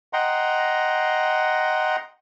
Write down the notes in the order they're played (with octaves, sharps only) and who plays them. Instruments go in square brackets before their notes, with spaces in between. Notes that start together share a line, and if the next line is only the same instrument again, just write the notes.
[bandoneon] D#5 F#5 G5 A#5 C6